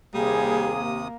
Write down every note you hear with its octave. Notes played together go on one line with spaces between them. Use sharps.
D#2 C3 G3 A#3 G#4 D#6